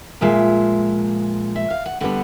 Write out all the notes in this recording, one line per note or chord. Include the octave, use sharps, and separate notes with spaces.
A#2 F3 G#3 E5
E5
F5
F#5
D3 G3 B3 D4 F#5